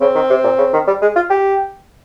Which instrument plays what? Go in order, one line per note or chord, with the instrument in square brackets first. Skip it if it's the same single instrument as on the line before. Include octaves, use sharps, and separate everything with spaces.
[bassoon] C#3 [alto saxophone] C4
[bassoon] D#3
C3
A#2
C#3
D#3
G3
G#3
F4
G4